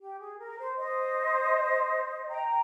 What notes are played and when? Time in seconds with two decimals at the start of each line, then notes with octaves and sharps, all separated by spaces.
0.01 G4
0.20 G#4
0.39 A#4
0.58 C5
0.77 C5 D#5
2.29 G5 A#5